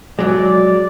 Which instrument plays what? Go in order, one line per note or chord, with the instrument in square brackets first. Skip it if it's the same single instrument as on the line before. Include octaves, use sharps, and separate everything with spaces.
[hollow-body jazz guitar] F#3 G#3 [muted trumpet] D5